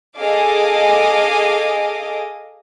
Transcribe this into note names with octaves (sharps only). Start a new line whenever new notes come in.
G#4 A4 D#5 F5 G#5 D6